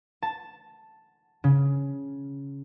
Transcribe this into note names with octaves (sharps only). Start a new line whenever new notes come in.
A5
C#3